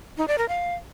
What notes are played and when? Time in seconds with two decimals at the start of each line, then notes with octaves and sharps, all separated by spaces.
0.17 D#4
0.28 D5
0.38 A#4
0.48 F5